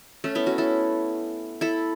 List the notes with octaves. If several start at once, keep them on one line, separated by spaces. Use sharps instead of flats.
A3 C#4
B3 E4
C#4 F#4
E4 A4
E4 A4